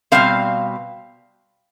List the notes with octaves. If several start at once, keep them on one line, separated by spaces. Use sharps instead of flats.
B2 G3 C4 F5